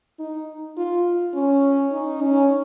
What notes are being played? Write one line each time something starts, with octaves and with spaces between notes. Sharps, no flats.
D#4
F4
C#4
D#4
C#4